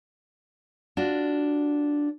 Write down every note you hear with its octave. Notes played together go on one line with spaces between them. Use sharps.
D4 F4 F#4